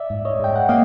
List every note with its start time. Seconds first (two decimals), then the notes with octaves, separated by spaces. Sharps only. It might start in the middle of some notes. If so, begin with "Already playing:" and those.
Already playing: D5 E5
0.10 G#2
0.25 C#5 D#5
0.40 G#2 G5
0.56 F#5
0.69 A#3 D#5 F5